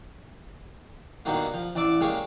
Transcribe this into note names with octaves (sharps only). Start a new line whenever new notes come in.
G2 B2 D#3 A#3
F3
A1 D5 E5 D6
G3 G#3 A#3 C#4